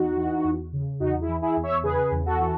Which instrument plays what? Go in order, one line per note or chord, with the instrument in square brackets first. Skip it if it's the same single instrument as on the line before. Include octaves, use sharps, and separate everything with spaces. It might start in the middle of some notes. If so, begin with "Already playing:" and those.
Already playing: [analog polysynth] E2 D#4 F#4
E3
E2
C#3
E2 D#4 F#4
E4 G#4
E3
E4 G#4
E2
C#5 E5
C#3 G#4 B4
E2
F#4 A4
E3